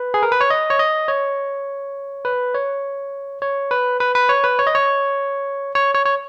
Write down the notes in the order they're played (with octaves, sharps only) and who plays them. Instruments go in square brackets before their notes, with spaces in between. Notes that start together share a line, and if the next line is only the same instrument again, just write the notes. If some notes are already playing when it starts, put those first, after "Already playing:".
Already playing: [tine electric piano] B4
G#4
A#4
B4
C#5
D#5
C#5
D#5
C#5
B4
C#5
C#5
B4
B4
B4
C#5
B4
C#5
D#5
C#5
C#5
C#5
C#5